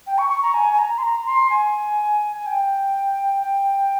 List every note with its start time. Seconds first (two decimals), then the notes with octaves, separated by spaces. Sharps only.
0.07 G5
0.18 C#6
0.30 C#6
0.43 A#5
0.54 G#5
0.73 G#5
0.79 A#5
0.98 C6
1.03 A#5
1.26 C6
1.50 G#5
2.39 G#5
2.46 G5
3.43 G5